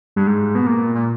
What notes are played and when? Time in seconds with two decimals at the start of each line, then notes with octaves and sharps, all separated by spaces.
0.16 G2
0.27 G#2
0.55 B2
0.67 A#2
0.95 A#2